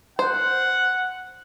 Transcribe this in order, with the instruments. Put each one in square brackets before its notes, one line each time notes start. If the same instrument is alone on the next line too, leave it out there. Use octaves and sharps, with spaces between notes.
[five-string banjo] C5 [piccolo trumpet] F#5